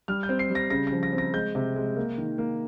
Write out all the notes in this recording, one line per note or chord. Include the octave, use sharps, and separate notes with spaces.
G3 F6
G6
C4
C7
G3
A#6
C#3 A#6
A#6
F3
A#6
C4
A#6
G#3 G6
C3
G#3
A#3
D#3
A#3